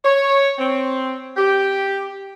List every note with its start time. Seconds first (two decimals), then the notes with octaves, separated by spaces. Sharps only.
0.04 C#5
0.59 C4
1.37 G4